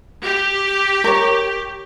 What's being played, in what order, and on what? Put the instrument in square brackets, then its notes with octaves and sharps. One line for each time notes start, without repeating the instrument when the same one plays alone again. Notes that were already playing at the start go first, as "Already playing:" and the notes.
[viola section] G4
[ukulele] A#4 C#5